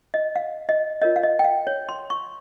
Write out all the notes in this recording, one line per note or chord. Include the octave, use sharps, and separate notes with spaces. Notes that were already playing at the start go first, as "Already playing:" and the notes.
D#5
F5
D#5
F4 A#4 C#5 D#5
F5
D#5
G5
F5
C#5
C6
C#6